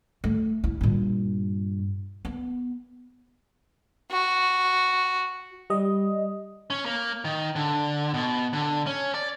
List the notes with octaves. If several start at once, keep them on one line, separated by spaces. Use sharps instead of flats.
A3
E4
G2 A#2
B3
F#4
G3 D#5
C#4
A#3
D#3
D3
B2
D3
C#4
D5